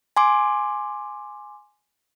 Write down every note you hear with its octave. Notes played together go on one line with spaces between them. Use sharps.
G#5 C6 D6